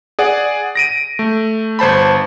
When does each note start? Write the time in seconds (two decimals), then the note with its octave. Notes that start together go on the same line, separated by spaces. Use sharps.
0.19 G#4 D5 F#5
0.75 A#6 D7 D#7
1.19 A3
1.79 G1 C5 A5 B5